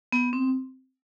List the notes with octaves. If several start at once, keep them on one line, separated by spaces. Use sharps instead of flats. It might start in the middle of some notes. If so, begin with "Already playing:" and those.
B3
C4